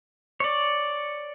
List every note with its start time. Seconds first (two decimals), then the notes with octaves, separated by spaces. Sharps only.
0.40 C#5 D5